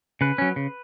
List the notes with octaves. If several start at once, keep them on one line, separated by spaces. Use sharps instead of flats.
C#3 B4
F#3 C#4
C#3